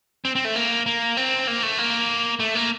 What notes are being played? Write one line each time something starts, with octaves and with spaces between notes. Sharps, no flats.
C4
C4
A3
A#3
A#3
C4
A#3
A3
A#3
A3
A#3